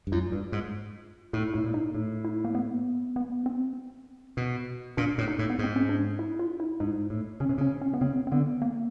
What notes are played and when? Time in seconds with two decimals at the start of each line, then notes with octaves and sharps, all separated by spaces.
0.07 G2
0.12 F#2 F4
0.32 G2
0.52 G#2
1.33 A2 E4
1.54 A2 E4
1.64 A#2
1.74 D#4
1.95 A2
2.24 E4
2.45 A#3
2.55 B3
3.16 B3
3.46 C4
4.37 B2
4.97 A#2 D4
5.18 A2
5.28 D#4
5.39 A2
5.50 B3
5.59 G#2 C4
5.76 C#4
5.89 D4
6.19 E4
6.39 F4
6.60 E4
6.80 G#2 D#4
7.10 A2
7.40 C#3 C#4
7.49 C3
7.58 C#3 C#4
7.81 C#4
7.93 B3
8.01 C#3 C4
8.27 C4
8.32 D3 B3
8.62 A#3